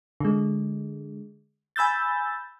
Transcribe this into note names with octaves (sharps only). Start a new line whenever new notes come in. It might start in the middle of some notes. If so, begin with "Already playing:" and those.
D3 G#3
G#5 B5 E6 G6 A6